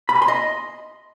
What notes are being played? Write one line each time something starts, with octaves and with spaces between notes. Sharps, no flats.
B5
G#5
C6
D#5